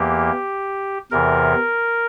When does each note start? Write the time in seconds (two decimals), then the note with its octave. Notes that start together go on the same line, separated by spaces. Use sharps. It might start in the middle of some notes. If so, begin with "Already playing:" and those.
Already playing: E2 E3 A#3 G4
1.11 E2 C3 E3 A#4